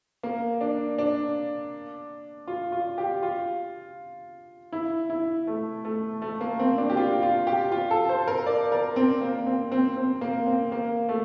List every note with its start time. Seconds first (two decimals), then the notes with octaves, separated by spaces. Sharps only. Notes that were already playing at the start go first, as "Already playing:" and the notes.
0.23 A#3
0.61 D4
0.98 D4
2.47 F4
2.72 F4
2.98 G4
3.23 F4
4.72 E4
5.10 E4
5.47 A3
5.85 A3
6.22 A3
6.41 A#3
6.59 C4
6.78 D4
6.90 G4
6.97 F4
7.22 F4
7.47 G4
7.72 F4
7.91 A4
8.09 C5
8.28 A#4
8.46 D5
8.72 A#4
8.96 C4
9.21 A#3
9.46 C4
9.72 C4
9.97 C4
10.21 A#3
10.46 C4
10.72 A#3
11.09 A3